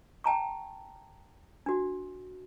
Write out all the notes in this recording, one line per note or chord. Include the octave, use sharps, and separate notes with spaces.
G5 A5 A#5 C#6
D4 F#4